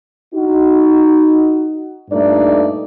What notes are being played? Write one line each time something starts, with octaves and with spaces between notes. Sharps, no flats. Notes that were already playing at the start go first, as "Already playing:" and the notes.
D#4 F#4
G2 A#2 A3 D#4 D5